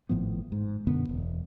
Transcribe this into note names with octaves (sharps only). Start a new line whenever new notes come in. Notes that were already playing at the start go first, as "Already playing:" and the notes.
G#1 A2 F3 B3
G#2
F#2 B2 D3 B3
E1